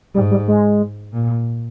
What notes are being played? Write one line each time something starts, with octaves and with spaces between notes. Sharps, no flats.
G#2 G3
G3
G#3
A#2